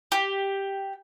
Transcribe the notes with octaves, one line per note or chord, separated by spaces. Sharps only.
G4